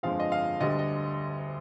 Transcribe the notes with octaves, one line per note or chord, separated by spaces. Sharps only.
G1 F2 D3 F3 G#3 F5
D#5
F5
D2 D3 G3 D#5
D#5